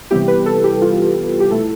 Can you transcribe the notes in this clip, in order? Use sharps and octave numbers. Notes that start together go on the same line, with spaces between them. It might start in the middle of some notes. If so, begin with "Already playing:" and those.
C3 E3 G3 B3 E4 G4
B4
A4
G4
F4
G4
B2 A3 E4 A4